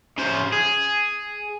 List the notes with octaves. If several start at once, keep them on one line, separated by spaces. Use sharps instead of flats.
C#3 C5
G#4